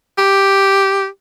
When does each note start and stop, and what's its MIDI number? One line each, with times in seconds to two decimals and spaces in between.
0.18 1.06 67